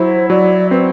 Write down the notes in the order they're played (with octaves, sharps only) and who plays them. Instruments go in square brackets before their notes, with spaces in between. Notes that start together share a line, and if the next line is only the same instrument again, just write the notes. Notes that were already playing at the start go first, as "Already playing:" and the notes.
Already playing: [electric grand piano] F#3 E4 [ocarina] C5
[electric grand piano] F#3 [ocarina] D5
[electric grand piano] C4 [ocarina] B4